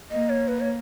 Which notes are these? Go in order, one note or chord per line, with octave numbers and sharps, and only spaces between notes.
A#3 D#5
C#5
B4
C#5